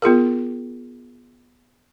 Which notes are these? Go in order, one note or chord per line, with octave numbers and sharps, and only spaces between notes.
B3 F4 G#4 A#4